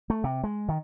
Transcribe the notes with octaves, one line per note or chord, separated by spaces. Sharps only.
A3
C3
G#3
D#3